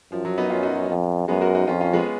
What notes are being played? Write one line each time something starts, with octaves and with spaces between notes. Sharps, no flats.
F#2 F3
F#3
B3 D#4
F#2 C#4 F4
D#4 F#4
F2
F#2 G#3 B3
F#4 A#4
D#4 F#4
F2 C#4 F4
C#4 F4
G#3 B3